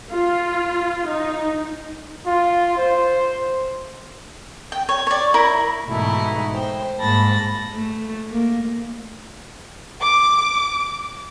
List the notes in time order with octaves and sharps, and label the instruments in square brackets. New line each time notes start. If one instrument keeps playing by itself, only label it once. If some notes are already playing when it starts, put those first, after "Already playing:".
[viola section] F4
D#4
[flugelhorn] F4
C5
[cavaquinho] G5
C#5
C#5 D5
E4 A#4 B5
[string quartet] G#2 B2 E3 A3 D#4 E4
C5 G5
G#2 A#3 A5 B5 A6 A#6
[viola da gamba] A3
A#3
[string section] D6